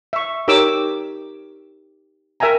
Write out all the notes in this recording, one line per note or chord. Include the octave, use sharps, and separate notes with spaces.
E5 C#6
D#4 G4 A#4 C#5 D6 E6
A#4 E5 G5 G#5 A#5